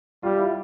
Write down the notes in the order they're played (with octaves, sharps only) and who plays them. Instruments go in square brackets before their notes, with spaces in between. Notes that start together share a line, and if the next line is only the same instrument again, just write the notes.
[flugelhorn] G3 [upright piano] F4
[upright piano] E4